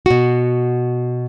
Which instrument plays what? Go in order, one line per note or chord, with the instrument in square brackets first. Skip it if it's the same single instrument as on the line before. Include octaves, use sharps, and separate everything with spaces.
[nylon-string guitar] B2 F#4